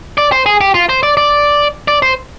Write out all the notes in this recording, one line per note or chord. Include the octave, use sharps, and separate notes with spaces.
D5
C5
G#4
G4
F4
C5
D5
D5
D5
C5